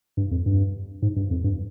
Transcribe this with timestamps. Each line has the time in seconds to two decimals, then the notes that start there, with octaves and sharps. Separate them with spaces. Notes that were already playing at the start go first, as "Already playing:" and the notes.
0.17 G2
0.31 F2
0.46 G2
1.02 G#2
1.16 G2
1.31 F2
1.44 G2